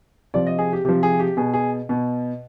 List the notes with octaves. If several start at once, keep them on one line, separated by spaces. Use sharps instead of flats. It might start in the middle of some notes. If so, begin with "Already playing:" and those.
C3 F3 D5
D#5
G#4
G4
C3 F3 G4
G#4
G4
B2 G#4
G#4
B2